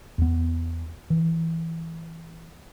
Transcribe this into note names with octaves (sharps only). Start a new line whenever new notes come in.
E2 B3
E3